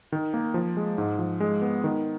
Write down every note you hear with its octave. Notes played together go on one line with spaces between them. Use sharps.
D#3
A#3
F3
G#3
G#2
F3
G#3
B3
D#3